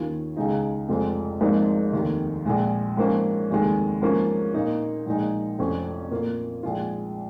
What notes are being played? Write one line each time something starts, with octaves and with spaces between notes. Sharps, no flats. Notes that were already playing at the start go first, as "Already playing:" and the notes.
Already playing: D#2 D#3 C#4 F4
C#2 C#3 G#3 D#4
F1 F2 F3 G#3 F4
G#1 G#2 F3 A#3 D#4
F1 D#2 D#3
A#1 A#2 G#3
G#2 F3 A#3 C#4
F1 D#2 D#3 G#3
G#2 F3 A#3 C#4 F4
A#2 A#3 D#4
A#1 A#2 G#3 D#4
F1 F2 F3 C#4 F4
A#2 A#3 F4
A#1 G#2 G#3 F4